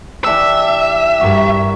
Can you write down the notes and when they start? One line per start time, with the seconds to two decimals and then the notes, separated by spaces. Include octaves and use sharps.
0.24 E3 D4 G4 E5
1.20 G2 F#4 A#4